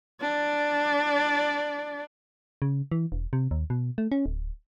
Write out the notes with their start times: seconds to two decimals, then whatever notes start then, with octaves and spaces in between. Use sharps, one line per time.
0.21 D4 D5
2.62 C#3
2.92 E3
3.12 E1
3.33 C3
3.51 D#2
3.70 B2
3.98 A3
4.12 C#4
4.26 D1